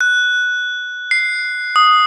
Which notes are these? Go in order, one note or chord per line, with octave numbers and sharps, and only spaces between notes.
F#6
C7
D#6